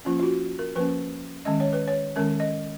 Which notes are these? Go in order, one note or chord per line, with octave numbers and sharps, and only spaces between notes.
F3 A#3 C#4 F4
F4
F#4
A#4
F3 A#3 C#4 B4
D#3 G#3 C#4 D#5
C#5
B4
C#5
D#3 G#3 C#4 A#4
D#5